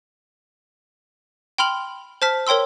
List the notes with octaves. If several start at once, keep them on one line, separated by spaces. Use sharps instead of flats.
G5 B5 C6 F6 F7 F#7
C5 A5 F6 B6
A#4 C#5 G5 C6 E6